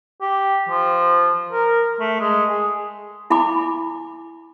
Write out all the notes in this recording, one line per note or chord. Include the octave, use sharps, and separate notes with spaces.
G4
F3
A#4
A3
G#3
G#4
E4 G#5 B5 D6